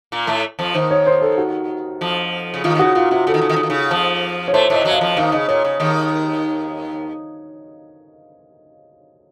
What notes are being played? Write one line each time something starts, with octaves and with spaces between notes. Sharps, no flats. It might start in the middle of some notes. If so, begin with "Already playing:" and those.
A#2 A#3
A2 A3
F2 F3
D#2 D#3 C5
C#5
C5
A4
F#4
F2 F3
C#3
D#2 D#3 F4
D#3
C#3 F#4
A#2 F4
C3 F#4
C#3 A4
D#3
C#3
D#3
C#3
D#3
C#3
F2 F3
C#5
A2 A3 C5
A2 A3 D#5
F#2 F#3
F5
D#5
F2 F3
D#2 D#3 F5
C#3 D#5
A#2 C#5
C#3
D#2 D#3